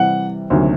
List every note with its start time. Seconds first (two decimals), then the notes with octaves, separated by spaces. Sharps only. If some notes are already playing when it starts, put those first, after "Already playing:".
Already playing: C3 E3 G3 F#5
0.50 D2 C3 D#3 F#3 A#3